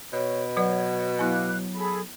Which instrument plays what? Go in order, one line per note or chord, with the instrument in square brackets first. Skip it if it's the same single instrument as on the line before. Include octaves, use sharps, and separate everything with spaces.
[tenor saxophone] B2 [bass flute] C#5
[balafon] F#3 B4 D5 [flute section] C#5 [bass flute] F#5
[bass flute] F#3 [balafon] B3 E4 [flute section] F5 D6 F#6
[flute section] G#4 A4 B5